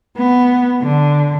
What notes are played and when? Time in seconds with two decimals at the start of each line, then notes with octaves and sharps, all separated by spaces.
0.17 B3
0.82 D3